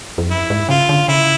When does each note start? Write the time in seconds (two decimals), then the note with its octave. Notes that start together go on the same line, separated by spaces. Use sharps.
0.18 F2
0.30 F#2 E4
0.50 G#2
0.69 C#3 F4
0.89 D3
1.08 C#3 E4